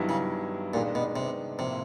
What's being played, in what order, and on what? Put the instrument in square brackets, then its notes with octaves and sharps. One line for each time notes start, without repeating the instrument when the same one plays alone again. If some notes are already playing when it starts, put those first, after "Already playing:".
Already playing: [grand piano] G2 D#3 F#3 B3 E4
[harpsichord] C#3
[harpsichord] A#2 [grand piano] D#3 G#3 B3 D4
[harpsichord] B2
C3
[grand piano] A2 F3 A#3 [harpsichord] C3